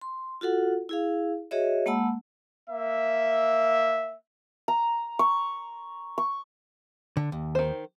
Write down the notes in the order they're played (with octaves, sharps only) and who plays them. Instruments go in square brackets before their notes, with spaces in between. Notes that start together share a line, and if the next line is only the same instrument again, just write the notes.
[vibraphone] C6
F4 F#4 A4 F#5
E4 G#4 F5
F#4 G#4 C#5 D#5 E5
G#3 A#3 F#5 A5 B5 E6
[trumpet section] A#3 E5
[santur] A#5
C#6
C#6
[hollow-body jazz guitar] D3
D#2
[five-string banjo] D#3 C5